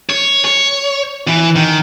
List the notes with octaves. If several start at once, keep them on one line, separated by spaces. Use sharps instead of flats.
C#5
C#5
E3
D#3